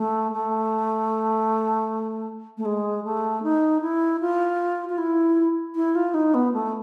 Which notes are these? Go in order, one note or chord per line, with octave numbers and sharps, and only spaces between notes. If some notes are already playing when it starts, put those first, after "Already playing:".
Already playing: A3
A3
A3
G#3
A3
D#4
E4
F4
F4
E4
E4
F4
D#4
B3
A3